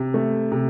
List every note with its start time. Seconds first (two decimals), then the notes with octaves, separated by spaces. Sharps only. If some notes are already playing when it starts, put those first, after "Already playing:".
Already playing: C3
0.14 A3
0.52 C3